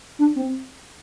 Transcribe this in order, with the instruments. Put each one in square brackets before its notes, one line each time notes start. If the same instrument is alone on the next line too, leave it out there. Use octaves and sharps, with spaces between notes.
[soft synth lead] D4
C4